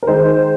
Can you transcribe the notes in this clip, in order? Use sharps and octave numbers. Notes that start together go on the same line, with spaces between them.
A#4
D#3 G#3 C5